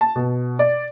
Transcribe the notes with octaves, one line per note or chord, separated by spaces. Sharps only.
A5
B2
D5